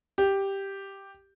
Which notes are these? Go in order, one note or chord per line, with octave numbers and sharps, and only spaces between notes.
G4